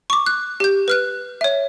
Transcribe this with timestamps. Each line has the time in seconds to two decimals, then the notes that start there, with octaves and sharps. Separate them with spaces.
0.10 C#6 D6
0.26 F#6
0.60 G4 G6
0.88 B4 F6 F#6
1.41 C#5 E5